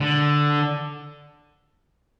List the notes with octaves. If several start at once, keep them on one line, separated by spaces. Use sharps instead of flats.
D3